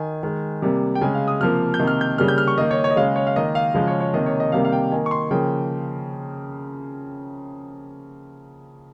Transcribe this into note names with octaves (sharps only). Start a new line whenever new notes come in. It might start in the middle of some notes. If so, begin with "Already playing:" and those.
Already playing: D#3 G#5
D#3 G#3
C3 G3 A#3
G5
C#3 G#3 G#5
F5
D#6
C3 F3 A#3 F6
G6
C3 D#3 A#3
F6
G6
C#3 G3 A#3 F6
G6
F6
C#6
D#3 A#3 D#5
C#5
C#5
D#5
C#3 G#3 F5
C#5
F5
D#3 A#3 D#5
F5
C#3 F3 G#3 F5
C#5
C#5
C3 D#3 A#3 D#5
C#5
D#5
C3 D#3 G3 A#3 F5
F5
G5
D#3 A#3 G#5
C#6
C6
C#3 F3 A#3 G5